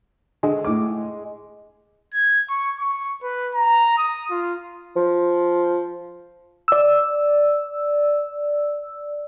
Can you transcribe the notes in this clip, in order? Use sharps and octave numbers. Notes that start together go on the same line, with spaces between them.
D3 G#3
A2 D6
G#6
C#6
C#6
B4
A#5
D#6
F4
F3
D5 E6